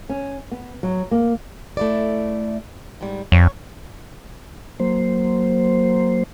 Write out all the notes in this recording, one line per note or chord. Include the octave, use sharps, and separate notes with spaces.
C#4
B3
F#3
A#3
A3 E4 D5
G#2 G3
F2 C#5
F#3 A#3 C5